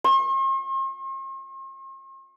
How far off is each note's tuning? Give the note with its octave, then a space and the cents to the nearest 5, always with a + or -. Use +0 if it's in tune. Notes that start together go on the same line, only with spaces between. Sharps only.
C6 +45